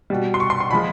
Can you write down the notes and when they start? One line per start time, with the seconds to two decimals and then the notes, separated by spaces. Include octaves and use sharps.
0.10 B2 G3
0.34 C6
0.40 C#6
0.50 C6
0.60 C6
0.71 A#2 F3 G#3 B5